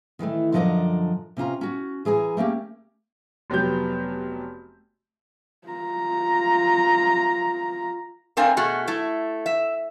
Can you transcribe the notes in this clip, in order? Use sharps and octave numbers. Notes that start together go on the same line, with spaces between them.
D#3 E3 G3 A3
F#2 D3 F3 D5 D#5 A#5
C3 C#4 F4 A#5
C#4 F#4
E3 G#4 G#5 A#5
A3 A#3 C#4 G4
F1 F#3 B3 G4 G6
F4 A#5
A3 C4 D4 A#4 F5 G#5
B2 A3 F#4 G#4
A3 E4
E5